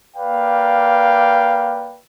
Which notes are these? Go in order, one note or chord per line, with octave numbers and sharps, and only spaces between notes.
A#3 B4 D5 F5 G5